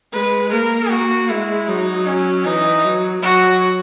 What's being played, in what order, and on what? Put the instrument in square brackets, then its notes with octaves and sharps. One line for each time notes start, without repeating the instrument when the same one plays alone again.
[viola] G#3 [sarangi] B4
[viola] A#3 [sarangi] A#4
[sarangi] F#4
[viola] G#3 [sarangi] E4
[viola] F#3 [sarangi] D#4
[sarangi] C#4
[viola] E3 [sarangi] D#4
[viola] F#3
[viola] F#3 [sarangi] F#4